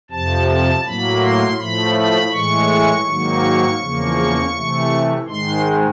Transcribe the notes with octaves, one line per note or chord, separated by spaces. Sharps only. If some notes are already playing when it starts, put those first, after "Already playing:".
F2 C3 F3 A5
A5
A2 F#3 A#3 B5
C6
A2 F3 A3 B5
B5
A2 E3 G#3 C#6
G#2 D#3 F#3 A#3
E2 C#3 F3 A#3
C3 E3 A3
G#2 D#3 G#3 C6